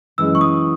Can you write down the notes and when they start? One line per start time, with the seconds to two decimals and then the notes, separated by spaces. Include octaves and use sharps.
0.18 F#2 E3 G#3 E6
0.35 C#6
0.41 D#6